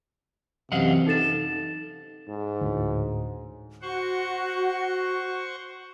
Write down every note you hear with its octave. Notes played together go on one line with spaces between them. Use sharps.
F#2 C3 E3 D#5 F5 F#5
D#4 A4 A6 E7
G#2
D2 A2
F#4 C5 F#5 C#6